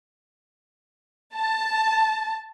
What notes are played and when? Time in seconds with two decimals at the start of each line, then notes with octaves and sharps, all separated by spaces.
1.35 A5